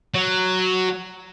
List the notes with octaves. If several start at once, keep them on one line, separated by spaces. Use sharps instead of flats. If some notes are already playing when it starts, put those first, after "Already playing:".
F#3